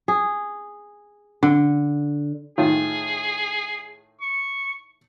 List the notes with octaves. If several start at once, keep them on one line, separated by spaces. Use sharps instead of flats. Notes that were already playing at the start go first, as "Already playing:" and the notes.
G#4
D3
A2 D#3 F4 G#4
C#6